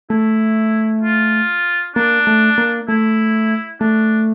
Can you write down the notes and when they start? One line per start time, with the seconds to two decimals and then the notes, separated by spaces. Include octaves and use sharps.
0.10 A3 E4
1.03 F4
1.96 A#3 D4
2.27 A3
2.58 A#3
2.88 A3 E4
3.81 A3 D4